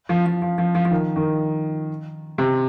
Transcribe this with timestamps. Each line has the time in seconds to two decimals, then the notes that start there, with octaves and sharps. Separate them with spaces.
0.09 F3
0.26 F3
0.42 F3
0.58 F3
0.75 F3
0.85 F3
0.91 D#3
1.16 D#3
2.38 C3